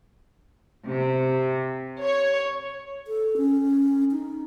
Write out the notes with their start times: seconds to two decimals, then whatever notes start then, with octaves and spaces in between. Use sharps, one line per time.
0.88 C3
2.02 C#5
3.07 A4
3.37 C#4
4.12 D#4